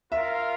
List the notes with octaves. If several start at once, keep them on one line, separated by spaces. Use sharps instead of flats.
F4 A#4 E5 F5